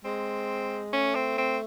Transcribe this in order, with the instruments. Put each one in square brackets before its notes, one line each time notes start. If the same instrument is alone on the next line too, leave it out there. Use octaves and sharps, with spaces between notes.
[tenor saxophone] G#3 [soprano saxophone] C4
[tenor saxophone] A3 [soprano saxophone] C#4
[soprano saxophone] C4
C4